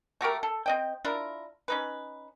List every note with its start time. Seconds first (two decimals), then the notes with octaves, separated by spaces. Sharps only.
0.21 A3 F#4 G4 A#4
0.43 A4
0.66 C4 D#5 G5
1.05 D4 E4 F4 A#4
1.68 C#4 D#4 B4